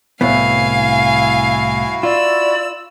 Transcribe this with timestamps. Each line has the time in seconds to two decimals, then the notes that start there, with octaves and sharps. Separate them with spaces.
0.21 C2 A2 B3 E4 F#4 F5 G#5
2.03 F4 D5 E6